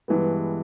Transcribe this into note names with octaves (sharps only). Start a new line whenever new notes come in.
G2 E3 G#3 B3